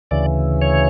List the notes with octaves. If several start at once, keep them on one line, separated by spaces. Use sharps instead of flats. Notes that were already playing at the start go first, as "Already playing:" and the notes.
D2 C#3 E3 D5
C#5